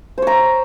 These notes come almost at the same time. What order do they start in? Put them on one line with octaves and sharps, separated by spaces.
C5 C#5 A#5